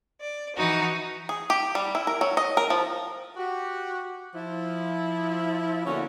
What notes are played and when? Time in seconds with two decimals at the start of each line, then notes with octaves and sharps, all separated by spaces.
0.19 D5
0.54 E3 D#4 F#4
1.29 G#4
1.50 G4
1.75 G3
1.95 E4
2.07 A#4
2.21 F#3
2.37 D#5
2.57 A#4
2.70 F3
3.37 F#4 G4
4.34 F3 E4
5.85 D3 A#3 B3 C#4 F#4 C#5